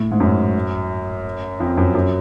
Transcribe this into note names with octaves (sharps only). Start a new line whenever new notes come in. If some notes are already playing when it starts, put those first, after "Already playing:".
Already playing: A2
G#2
F#2
F2
F#2
F#2